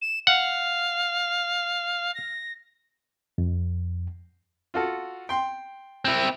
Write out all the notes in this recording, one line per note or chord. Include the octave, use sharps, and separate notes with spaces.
E7
F5 F#5
A#6
F2
F4 F#4 A4
G5 C6
C4 E4